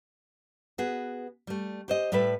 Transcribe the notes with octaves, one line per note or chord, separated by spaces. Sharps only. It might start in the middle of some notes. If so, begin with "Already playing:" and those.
B3 F#4 G#4
G3 A3
G4 C5 D#5
A2 G3 A4 B4 E5